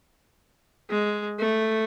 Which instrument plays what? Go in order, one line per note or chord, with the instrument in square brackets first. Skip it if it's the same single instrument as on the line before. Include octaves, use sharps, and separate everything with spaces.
[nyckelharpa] G#3
A3